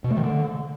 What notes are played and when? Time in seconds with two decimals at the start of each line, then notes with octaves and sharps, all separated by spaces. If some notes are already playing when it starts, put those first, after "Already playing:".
0.04 B2
0.11 A3
0.17 D#3
0.23 D3